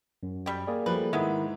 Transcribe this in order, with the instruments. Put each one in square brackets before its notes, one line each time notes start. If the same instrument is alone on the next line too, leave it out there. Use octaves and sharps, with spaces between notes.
[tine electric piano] F#2
[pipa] G3 G5
[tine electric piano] A#3 G#4 D5
[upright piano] F3 G3 A3 [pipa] B4
[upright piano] G#2 E5 [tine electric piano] D#3 E4 [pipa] G#3 B3